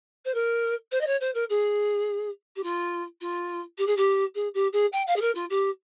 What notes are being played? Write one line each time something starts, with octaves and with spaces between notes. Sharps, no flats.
C5
A#4
C5
D#5
C#5
C5
A#4
G#4
G4
F4
F4
G4
G#4
G4
G#4
G4
G#4
G5
F5
G#4
A#4
F4
G4